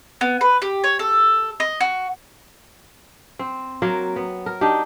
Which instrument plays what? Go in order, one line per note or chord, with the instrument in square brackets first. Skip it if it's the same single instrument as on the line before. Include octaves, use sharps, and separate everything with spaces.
[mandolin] B3
B4
G4
C#5
A4
D#5
F#4
[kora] C4
F#3 A#3 A#4
B3
A#4
D4 D#4 G4